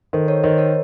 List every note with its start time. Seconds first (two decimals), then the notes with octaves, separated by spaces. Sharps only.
0.13 D#3 A4 C5
0.28 A#4 C#5
0.43 D#3 C5 D#5
0.58 A#4 C#5